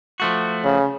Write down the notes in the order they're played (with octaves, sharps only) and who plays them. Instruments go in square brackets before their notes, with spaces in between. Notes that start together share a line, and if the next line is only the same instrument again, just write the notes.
[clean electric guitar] F3 A3 F#4
[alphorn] C#3